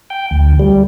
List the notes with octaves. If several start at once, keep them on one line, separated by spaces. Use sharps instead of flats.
G5
D2
G3